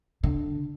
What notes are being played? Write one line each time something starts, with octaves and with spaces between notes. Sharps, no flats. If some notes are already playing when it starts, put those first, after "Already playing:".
D3